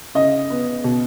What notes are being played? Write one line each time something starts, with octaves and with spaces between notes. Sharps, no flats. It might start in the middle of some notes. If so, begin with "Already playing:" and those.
C#3 D#5
B3
B2